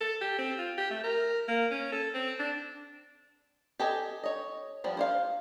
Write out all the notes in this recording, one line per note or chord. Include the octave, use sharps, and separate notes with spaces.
A4
G4
C4
F4
G4
A3
A#4
A#3
C#4
A4
C4
D4
G4 A4 D#5 G#5
C#5 D#5
F3 G3 B3
C5 C#5 F5